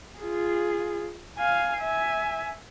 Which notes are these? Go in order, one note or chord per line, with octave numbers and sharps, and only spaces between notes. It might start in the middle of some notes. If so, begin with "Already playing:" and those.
F4 G#4
F5 G#5
E5 G#5